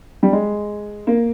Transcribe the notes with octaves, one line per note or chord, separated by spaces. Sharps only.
G3
G#3
A#3